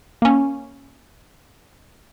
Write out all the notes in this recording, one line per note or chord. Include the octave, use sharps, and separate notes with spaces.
A#3 C#4